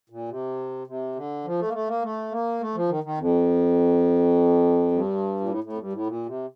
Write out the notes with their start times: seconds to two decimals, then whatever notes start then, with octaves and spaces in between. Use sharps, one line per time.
0.10 A#2
0.29 C3
0.87 C3
1.16 D3
1.45 F3
1.59 A3
1.68 A#3
1.73 A3
1.88 A#3
2.02 A3
2.31 A#3
2.61 A3
2.75 F3
2.89 D#3
3.04 D#3
3.18 F2
4.91 G2
5.40 A#2
5.49 A2
5.64 A2
5.73 F2
5.78 G2
5.93 A2
6.07 A#2
6.26 C3